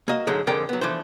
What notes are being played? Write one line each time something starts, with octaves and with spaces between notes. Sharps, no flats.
A#3 F#4 D#5 F5
G#2 D3 F#3 G#3 A3
F2 D3 G#3 A#4 D5 G5
F#3 B3
E3 F3 A3 D4 C5